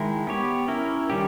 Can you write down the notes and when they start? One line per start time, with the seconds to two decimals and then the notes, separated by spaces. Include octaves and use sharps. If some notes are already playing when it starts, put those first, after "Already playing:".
Already playing: D#3 G#3 E4 A#4
0.27 B3 G4 C#5
0.68 C#4 E4 A#4
1.10 D#3 G3 C#4 G4